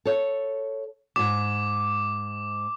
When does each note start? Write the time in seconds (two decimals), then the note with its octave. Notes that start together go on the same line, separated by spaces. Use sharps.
0.05 A4 C#5
1.16 E2 G#2 D6